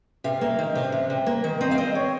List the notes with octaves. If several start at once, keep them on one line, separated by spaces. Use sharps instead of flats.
C3 F5
A#3
D#3
C3
C3
C3
A#3
D#3
C4 D#5
F5
C4 D#5
C#5